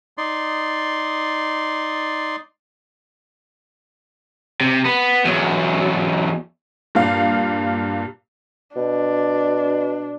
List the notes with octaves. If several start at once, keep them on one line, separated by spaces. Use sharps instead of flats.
D#4 D5 C6
C3
B3
E2 F#3
G2 A#2 F5
B2 D4